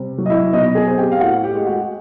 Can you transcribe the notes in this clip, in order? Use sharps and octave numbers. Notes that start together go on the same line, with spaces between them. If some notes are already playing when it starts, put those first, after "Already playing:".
Already playing: C3 G3
F#3
D#5
E4 E5
B2 D#4 D#5
G#4 G#5
C4
G4 G5
F5
A2 F#4 F#5
G4 G5
G#3
F#4 F#5